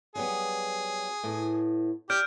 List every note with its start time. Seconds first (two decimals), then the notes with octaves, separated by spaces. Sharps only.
0.15 F#3 G3 B3 G#4
1.23 A2 B3
2.10 G4 D5 F6 G6 D7